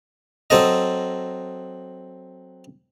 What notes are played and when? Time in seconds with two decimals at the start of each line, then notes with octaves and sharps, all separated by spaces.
0.50 F#3 C4 A4 D#5